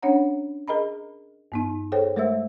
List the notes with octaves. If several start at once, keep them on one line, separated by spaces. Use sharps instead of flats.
C#4 D4 C#5 F#5 A#5
G#4 A#4 D#5 A#5 B5
G2 B3 D#4
G#4 A4 C5 C#5 G5
G#3 A3 A#4 C5 E5 E6